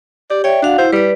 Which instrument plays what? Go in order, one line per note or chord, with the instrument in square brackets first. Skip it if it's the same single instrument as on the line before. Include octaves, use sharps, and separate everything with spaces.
[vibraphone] G4 [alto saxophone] D5
[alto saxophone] C#5 [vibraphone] D5 E5 G5
[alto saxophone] D4 [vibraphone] F#4 F5 F#5
[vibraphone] E4 [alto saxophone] C5
[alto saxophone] G3 [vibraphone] B4 D5